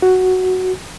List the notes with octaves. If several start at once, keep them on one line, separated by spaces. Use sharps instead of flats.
F#4